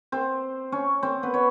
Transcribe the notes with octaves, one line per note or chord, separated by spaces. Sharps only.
C4 C5
C#4 C#5
C4 C5
B3 B4
C#5